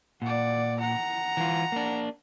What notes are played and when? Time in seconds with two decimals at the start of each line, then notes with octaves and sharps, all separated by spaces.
0.22 A#2 D5 F#5
0.79 F#5 A#5
1.37 E3 F4
1.72 A#3 D4